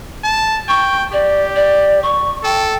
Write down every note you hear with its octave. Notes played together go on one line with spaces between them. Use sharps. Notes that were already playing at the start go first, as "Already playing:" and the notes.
A5
G5 C#6
G4 D5
D5
C#6
A4 G5